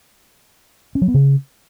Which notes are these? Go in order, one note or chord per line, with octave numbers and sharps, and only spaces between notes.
C#4
F#3
B3
C#3